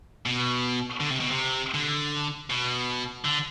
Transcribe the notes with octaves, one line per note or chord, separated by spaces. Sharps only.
B2
D3
C3
B2
C3
D3
B2
D3